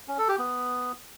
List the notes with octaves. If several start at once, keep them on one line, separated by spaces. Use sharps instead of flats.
C#4
A4
G4
B3